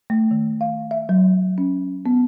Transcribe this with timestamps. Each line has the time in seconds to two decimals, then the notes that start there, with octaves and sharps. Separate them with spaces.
0.10 A3
0.31 D#3
0.61 F5
0.91 E5
1.09 F#3
1.58 C#4
2.06 B3